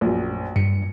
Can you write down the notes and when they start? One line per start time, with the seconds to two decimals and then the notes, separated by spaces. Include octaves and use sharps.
0.01 A#1 F#2
0.56 G2 C#7